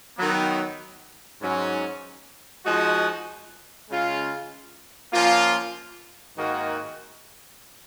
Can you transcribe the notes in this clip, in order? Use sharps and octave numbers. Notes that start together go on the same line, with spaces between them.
D#3 F#3 B3
G#2 F#3 C#4
F3 G#3 D#4 F#4
C#3 G#3 C#4 F4
F3 A#3 C#4 F4
G#2 D#3 A#3 D#4 F#4